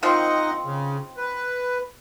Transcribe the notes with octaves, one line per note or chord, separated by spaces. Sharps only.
D#3 F3 C4 D#4 D#5 F#5
C#3
B4